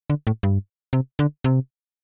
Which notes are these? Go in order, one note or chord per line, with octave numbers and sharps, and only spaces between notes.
D3
A2
G2
C3
D3
C3